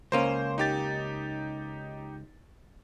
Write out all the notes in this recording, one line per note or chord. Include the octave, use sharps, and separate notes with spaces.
C#2 A#3 C#4 C5
D#4 G4 A6